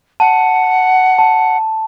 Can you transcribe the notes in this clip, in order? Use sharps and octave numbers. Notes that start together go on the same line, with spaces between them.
F#5 A5
A5